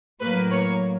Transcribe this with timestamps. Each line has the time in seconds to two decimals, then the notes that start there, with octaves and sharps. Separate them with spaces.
0.21 A2 F#3 A#3 B4
0.51 C#5